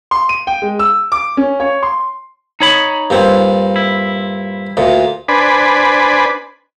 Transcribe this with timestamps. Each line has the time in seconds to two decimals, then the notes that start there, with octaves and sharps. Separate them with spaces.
0.11 C6
0.29 D#7
0.47 G5
0.62 G#3
0.79 E6
1.12 D6
1.37 C#4
1.60 C#5
1.83 C6
2.60 D#4 C#5 B5
3.10 G2 A#2 C4
3.76 E4
4.77 D2 A#2
5.28 D4 B4 C5 D5 G#5 B5